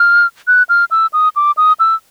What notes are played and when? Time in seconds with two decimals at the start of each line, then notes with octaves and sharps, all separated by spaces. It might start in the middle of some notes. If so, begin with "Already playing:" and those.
Already playing: F6
0.47 F#6
0.69 F6
0.91 E6
1.13 D#6
1.36 D6
1.57 D#6
1.80 E6